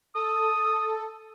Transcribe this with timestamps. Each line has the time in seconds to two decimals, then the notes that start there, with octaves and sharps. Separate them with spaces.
0.15 A4 D#6